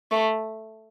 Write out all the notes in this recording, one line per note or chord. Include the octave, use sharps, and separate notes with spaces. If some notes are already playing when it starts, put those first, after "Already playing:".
A3